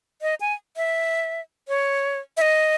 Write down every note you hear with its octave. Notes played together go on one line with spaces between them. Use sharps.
D#5
G#5
E5
C#5
E5
D#5